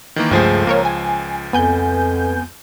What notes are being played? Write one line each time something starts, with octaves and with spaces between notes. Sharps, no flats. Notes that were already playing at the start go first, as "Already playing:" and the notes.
D#3 E3 A#3
C#2 G2 F3 A3 G#4 C5
A#3 A#4 C#5
G#5
F2 B3 G#5 G6